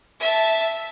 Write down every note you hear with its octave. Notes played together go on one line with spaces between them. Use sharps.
E5 A5